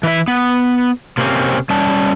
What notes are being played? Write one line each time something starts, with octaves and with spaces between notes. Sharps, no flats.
E3 E5
B3
C3 A#3 C4 C#4
G3 C#4 A5